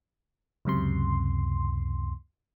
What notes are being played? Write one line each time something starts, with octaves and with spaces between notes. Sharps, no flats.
C#2 F#2 C3 C6